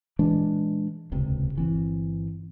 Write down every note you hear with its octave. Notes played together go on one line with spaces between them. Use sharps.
A#2 E3 G#3 D4
D#1 C#2 C3
G1 E3 C4